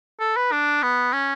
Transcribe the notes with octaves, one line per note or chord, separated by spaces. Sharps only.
A4
B4
D4
B3
C#4